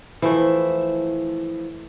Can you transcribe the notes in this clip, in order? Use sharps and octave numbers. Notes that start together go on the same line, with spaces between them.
E3 F3 A3 E4 C5